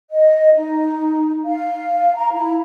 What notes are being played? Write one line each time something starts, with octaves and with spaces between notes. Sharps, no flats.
D#5
D#4
F5
A#5
E4